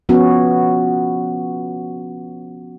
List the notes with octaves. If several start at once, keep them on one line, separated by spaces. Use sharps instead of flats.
F3 B3 C#4 F#4